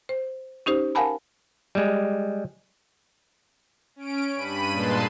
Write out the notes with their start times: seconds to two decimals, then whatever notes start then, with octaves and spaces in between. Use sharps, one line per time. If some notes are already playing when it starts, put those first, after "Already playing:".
0.09 C5
0.66 C#4 D#4 G4 C5
0.95 A#4 F5 F#5 G#5 A5 B5
1.75 G3 G#3
3.96 C#4 D7
4.34 G2 B5 D#7
4.72 A#2 G#3 B4 A5 C6